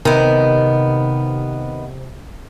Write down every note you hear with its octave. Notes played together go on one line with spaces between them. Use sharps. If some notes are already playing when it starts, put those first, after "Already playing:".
C3 D#3 B3